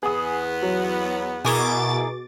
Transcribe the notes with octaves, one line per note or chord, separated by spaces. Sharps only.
E2 B3 G#4 D#6
F#3
B2 E4 G#4 A#4 D#5 C#6 D6 A6